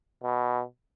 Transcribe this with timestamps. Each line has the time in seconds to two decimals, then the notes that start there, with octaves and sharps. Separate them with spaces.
0.24 B2